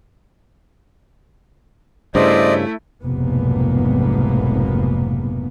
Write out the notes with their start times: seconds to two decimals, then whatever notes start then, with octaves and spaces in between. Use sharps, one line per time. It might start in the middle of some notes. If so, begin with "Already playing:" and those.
2.15 G2 C#3 A3 E4 C5 D5 D#5
3.03 F1 B1 G#2 B2 A#3 B3